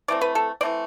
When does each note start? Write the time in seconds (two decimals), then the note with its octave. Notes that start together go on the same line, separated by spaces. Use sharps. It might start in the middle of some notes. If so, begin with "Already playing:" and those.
0.08 E3 A3 C4 D5
0.21 B4
0.35 A4
0.61 E3 A3 C4 D5